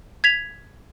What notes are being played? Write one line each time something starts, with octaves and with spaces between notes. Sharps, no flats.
G#6 B6 F7